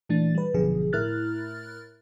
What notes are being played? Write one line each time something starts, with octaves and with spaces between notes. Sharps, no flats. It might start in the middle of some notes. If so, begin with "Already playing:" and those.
A#2 E3 A3 D4 A6
G3 B4
G#1 F#2 B2 D3 F3 G#4
A2 E4 A#4 F6 F#6 A6